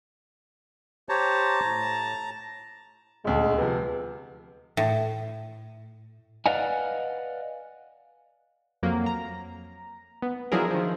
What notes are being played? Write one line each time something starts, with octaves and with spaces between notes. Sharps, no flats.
G4 C5 C#5 A5 A#5
A2
D#1 D2 G#3
C3 F3 B3
A2
B4 D5 D#5 F5 F#5 G#5
F2 F#3 A#3
A#5
B3
F3 F#3 D4 E4 G#4 A#4
D#3 F3